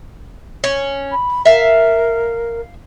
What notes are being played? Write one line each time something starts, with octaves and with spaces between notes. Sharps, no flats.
C#4
B5
A#4 E5 F5